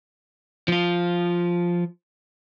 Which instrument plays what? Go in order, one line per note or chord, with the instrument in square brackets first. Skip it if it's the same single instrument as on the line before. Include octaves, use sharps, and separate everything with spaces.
[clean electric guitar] F3 F4